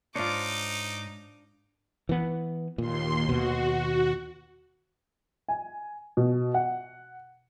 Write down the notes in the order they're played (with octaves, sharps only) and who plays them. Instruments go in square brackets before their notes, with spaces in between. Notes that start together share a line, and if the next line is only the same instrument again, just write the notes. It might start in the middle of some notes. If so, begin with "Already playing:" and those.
[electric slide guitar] G#2 C5 C#5 [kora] D4 F4 [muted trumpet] D#4 [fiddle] D6
[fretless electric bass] E3 B3
[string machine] D#2 C6 [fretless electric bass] A#2
[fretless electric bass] D#2 B2 [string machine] F#4
[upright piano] G#5
B2
F#5